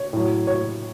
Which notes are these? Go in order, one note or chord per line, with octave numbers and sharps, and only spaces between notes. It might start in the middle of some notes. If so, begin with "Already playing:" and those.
Already playing: C#5
A2 F#3
C#5